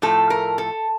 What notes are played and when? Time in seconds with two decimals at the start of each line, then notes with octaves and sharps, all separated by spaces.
0.02 A2 F3 A3 A4
0.30 A#4
0.58 A4